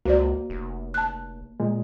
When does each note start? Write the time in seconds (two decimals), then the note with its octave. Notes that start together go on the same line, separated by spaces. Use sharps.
0.05 C#2 A#3 F#4 C5 D5
0.50 F1
0.94 A5 F#6
1.60 A#2 G#3